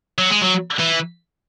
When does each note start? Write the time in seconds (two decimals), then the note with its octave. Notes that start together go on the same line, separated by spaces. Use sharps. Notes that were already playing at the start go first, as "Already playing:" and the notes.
0.18 F#3
0.30 G#3
0.42 F#3
0.79 E3